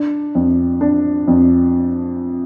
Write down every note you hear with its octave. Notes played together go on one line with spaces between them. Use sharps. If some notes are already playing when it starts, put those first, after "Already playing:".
Already playing: D4
F2
D4
F2